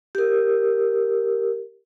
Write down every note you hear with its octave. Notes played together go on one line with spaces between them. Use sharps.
G4 A#4